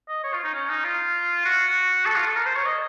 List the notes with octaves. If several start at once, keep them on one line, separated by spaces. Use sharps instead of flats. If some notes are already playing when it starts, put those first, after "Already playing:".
D#5
C#5
F4
D#4
C#4
D#4
F4
F#4
A4
F4
A4
A#4
C5
C#5
D#5